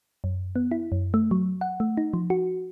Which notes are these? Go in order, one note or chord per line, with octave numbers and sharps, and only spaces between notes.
F#2
B3
E4
F#2
A3
F#3
F#5
A3
D#4
F3
F#4